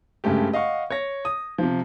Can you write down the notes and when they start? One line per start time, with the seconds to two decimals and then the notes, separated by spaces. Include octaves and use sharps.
0.24 G2 C#3 G#3 A3 G4
0.53 D#5 F5 F#5 C#6
0.90 C#5 A#6
1.25 D#6
1.58 C3 F3